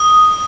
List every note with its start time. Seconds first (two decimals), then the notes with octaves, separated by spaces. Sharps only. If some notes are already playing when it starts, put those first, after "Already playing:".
Already playing: D#6